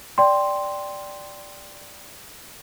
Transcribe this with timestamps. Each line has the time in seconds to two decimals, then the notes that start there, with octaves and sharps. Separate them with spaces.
0.18 D5 G5 C6